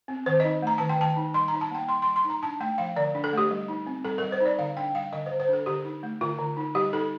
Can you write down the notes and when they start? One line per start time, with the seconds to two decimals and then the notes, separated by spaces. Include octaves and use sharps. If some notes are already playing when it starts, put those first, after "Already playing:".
0.08 C4
0.26 D#3 C5
0.40 D#4 D#5
0.62 A3 A#5
0.78 D#3 A5
0.89 G5
0.99 D#3 A5
1.17 D#4
1.34 G3 C6
1.48 D#4 A#5
1.61 A5
1.71 A#3 G5
1.88 G3 C6
2.02 G3 C6
2.16 C6
2.24 D#4
2.30 A#5
2.43 D4 A5
2.60 A3 G5
2.78 F3 F5
2.96 D3 D5
3.15 D4
3.24 A4
3.33 A3 G4
3.51 G3
3.68 D#4
3.87 C4
4.05 G3 A4
4.18 G3 A#4
4.32 C5
4.40 D#4 D5
4.59 D3 F5
4.77 D4 G5
4.95 G3 F5
5.13 D3 D#5
5.26 C5
5.31 D3
5.40 C5
5.49 D4 A4
5.66 D3 G4
5.85 D#4
6.03 A3
6.21 D3 F4
6.39 D3
6.57 D#4
6.75 G3 G4
6.93 D#4 A4